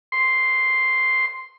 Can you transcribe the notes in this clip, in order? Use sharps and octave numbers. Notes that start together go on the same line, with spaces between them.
C6